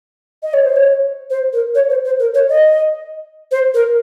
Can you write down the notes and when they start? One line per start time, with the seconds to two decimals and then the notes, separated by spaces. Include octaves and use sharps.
0.43 D#5
0.54 C#5
0.65 C5
0.76 C#5
1.30 C5
1.53 A#4
1.75 C#5
1.90 C5
2.05 C5
2.20 A#4
2.35 C#5
2.49 D#5
3.52 C5
3.74 A#4